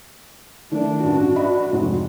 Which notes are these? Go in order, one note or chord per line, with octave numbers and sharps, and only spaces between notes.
D#3 A3 D4
A1 G2 F#4 A5
D5 D#5 B5
F1 G#2 G#3